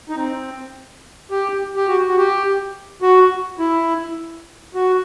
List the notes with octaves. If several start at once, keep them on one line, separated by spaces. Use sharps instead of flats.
D#4
C4
G4
G4
F#4
F#4
G4
F#4
E4
F#4